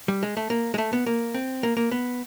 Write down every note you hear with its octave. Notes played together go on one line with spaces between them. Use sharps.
G3
G#3
A3
A#3
G#3
A3
B3
A#3
C4
A#3
A#3
B3